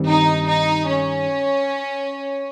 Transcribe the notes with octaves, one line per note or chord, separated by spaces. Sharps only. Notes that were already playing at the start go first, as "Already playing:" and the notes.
Already playing: G2 D#3 G3 C4
D#4
D#4
C#4